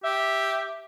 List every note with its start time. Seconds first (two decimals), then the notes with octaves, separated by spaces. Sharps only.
0.04 G4 E5